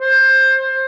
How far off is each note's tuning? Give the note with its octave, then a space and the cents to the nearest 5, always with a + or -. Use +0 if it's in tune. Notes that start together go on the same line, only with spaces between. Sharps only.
C5 +20